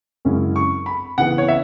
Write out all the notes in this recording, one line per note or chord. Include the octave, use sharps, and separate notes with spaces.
F#2 C#3 G#3 C#4 E4
C#6
B5
C#3 E3 B3 F#5
C#5
E5